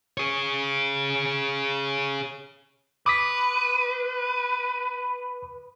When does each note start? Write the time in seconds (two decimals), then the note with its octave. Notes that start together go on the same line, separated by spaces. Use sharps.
0.18 G#4 C#5
3.06 B4 D6 D#6 B6